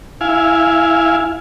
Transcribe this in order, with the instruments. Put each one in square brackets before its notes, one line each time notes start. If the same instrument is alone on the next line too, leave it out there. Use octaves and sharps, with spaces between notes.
[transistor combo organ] E4 F5 G#5